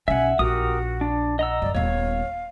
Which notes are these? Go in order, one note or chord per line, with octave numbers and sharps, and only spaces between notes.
B1 C#4 E5 F#5 G#5
A#1 F#4 G4 A#4 D#6
D4
D#5 F#5 A#5 E6
G1 F#2 D5
D#1 B3 C#5 F5